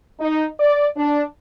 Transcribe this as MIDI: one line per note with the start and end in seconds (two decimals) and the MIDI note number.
0.20 0.46 63
0.60 0.87 74
0.96 1.22 62